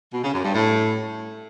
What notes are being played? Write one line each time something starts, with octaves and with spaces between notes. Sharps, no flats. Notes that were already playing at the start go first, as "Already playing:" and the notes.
B2
C#3
F#2
G2
A2